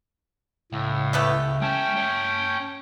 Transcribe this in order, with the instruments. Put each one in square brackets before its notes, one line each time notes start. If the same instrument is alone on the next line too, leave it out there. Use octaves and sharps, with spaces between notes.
[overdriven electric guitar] C#2 [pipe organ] A2
[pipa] A3 B3 G4
[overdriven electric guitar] G#3 A5 [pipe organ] C#4 G5
[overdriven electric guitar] C#5 A5